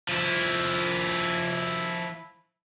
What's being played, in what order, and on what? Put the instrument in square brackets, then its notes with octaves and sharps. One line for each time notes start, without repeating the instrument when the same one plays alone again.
[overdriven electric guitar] F3 E4